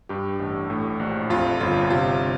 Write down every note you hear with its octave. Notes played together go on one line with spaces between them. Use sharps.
G2 G4
A1
A2
A#1
F2 F4
G1 F4
C3 F4